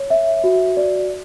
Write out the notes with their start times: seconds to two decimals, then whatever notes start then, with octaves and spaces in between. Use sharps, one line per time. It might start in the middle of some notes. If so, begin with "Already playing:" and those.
Already playing: C#5
0.10 E5
0.44 F#4
0.77 D5